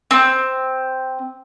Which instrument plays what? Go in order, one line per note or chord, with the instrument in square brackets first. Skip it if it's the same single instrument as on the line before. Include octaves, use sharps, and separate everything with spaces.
[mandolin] C4